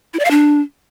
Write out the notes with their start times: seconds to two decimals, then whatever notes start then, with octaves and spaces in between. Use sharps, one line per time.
0.14 E4
0.19 D5
0.25 F5
0.31 D4